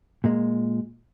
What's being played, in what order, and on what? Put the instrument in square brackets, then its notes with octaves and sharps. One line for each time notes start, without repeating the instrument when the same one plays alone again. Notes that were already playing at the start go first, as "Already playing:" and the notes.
[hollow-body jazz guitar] A#2 G#3